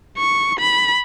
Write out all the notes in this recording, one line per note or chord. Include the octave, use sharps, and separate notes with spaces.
C#6
B5